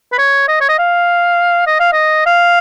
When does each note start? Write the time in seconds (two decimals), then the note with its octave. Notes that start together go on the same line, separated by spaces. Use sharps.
0.12 B4
0.18 C#5
0.48 D#5
0.61 C#5
0.69 D#5
0.79 F5
1.67 D#5
1.80 F5
1.93 D#5
2.27 F5